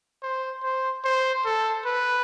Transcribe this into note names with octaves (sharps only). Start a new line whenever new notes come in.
C5
C5
C5
A4
B4